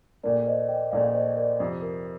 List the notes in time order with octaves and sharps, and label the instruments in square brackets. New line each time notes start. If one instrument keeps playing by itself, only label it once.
[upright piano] A#1 A#2 A3 [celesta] A#4 D5
[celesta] C5 D#5
D#5 G5
[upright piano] A#1 A#2 A3 [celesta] D5 F5
[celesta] F5
C5 D#5
A#4 D5
[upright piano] F2 C3 F3 [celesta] C5
[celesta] A#4